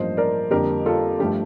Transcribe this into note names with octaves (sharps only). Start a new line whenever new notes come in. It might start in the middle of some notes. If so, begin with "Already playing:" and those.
Already playing: A1 G2 F3 A#3 C5 D#5
A#4 D5
F2 D3 G3 A#3 G4 A#4
F4 A4
G2 F3 A3 G4